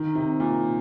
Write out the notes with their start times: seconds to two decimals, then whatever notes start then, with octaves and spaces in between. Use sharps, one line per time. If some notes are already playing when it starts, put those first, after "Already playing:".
Already playing: D#3
0.15 C3
0.40 A#2